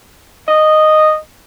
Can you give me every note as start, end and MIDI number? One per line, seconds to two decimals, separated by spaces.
0.49 1.16 75